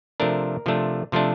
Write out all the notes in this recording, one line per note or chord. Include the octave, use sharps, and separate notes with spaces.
C3 F3 A3 D4 A#4
C3 F3 A3 D4
C3 F3 A3 D4